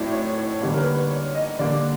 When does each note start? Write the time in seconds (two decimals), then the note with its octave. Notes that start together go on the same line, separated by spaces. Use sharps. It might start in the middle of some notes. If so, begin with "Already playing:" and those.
Already playing: A2 F#3 A3 C4 C5 D5
0.12 C#5
0.37 C#5
0.61 D3 G3 A#3 C#5
0.74 A#4
0.78 B4
0.94 B4
1.10 C#5
1.35 D#5
1.59 D3 G3 A#3 D5